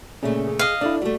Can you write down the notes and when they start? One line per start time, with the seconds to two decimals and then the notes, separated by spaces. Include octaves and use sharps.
0.23 A#2 C#3 A3 C#4 G#4 E5
0.47 G#4
0.59 D#5 F5
0.81 D4 E4 A4 D5
1.02 G3 A3 F#4